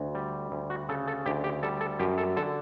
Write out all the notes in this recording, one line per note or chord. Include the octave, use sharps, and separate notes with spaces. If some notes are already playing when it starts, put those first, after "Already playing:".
Already playing: D2
G3
D2
F#4
C#3 A4
A4
D2 G4
G4
G3 A4
A4
F#2 G4
A4
D3 A4